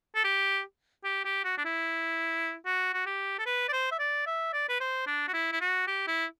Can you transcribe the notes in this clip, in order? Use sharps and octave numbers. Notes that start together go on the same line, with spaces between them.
A4
G4
G4
G4
F#4
D4
E4
F#4
F#4
G4
A4
B4
D5
C5
E5
D5
E5
D5
B4
C5
D4
F#4
E4
E4
F#4
G4
E4